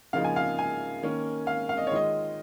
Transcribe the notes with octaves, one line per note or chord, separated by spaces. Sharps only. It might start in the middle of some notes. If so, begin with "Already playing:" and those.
C#3 F3 A#3 D#4 F5
G#5
F5
G#5
D#3 A#3 C#4
F5
F5
D#5
C#5
D#3 G#3 F4 D#5